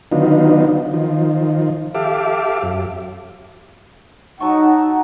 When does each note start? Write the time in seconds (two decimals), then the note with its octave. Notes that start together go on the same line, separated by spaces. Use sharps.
0.12 D3 D#3 F#3 B3 D#4 F4
0.94 D#3 F3
1.95 G4 A4 E5 F5 D6
2.63 F#2
4.40 F#3 D#4 F#5 A5 C#6